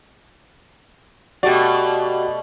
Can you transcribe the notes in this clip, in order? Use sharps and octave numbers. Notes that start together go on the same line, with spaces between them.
B2 A3 F#4 G4 D5